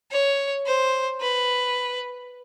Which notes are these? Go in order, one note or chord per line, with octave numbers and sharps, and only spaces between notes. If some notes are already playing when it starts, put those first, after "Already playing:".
C#5
C5
B4